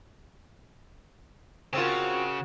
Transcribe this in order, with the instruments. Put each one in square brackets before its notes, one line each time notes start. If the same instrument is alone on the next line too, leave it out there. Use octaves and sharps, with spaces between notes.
[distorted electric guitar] C#3 [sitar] C4 F4 [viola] C#4 A#4 [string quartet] F#4